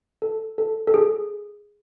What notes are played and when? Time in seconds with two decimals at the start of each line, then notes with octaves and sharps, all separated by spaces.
0.22 A4
0.58 A4
0.87 A4
0.94 G#4